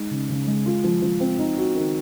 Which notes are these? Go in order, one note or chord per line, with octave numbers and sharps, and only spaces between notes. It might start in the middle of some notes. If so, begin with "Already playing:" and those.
Already playing: G#3 D#4
C#3
C#3
G#3
F4
F3
F3
C4
D#4
F#4
D#3